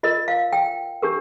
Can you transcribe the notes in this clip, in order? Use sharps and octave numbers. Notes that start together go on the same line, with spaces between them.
F4 A#4 D#5
F5
G5
D4 G4 A#4